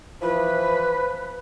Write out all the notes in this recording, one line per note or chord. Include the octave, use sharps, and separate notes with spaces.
E3 F3 B4